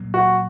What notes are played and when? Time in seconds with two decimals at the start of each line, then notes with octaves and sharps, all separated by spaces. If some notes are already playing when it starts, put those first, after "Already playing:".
Already playing: A#2 F#3 A#3
0.14 F#4